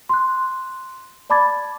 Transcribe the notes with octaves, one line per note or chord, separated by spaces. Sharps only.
C6 F#6
D5 A5 B5 D6 G#6 A6